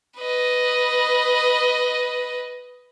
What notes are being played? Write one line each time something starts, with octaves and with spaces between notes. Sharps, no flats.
B4 D#5